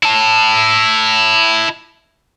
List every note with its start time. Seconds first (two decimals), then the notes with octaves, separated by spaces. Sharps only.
0.03 E4 A5